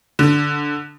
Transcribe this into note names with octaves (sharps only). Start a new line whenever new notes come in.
D3